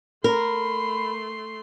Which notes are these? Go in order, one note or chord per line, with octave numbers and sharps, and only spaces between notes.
A3 A#4 B5 C6